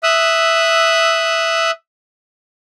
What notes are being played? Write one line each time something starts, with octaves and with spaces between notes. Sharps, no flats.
E5 D#6 E6 F#6